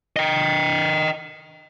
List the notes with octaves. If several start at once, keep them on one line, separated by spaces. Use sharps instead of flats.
D#5 G5